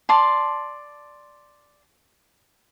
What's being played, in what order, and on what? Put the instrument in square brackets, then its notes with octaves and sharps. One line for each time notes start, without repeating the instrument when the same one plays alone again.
[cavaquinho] D5 A5 C6